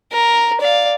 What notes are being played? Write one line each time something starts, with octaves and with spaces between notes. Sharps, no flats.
A#4
D5 F5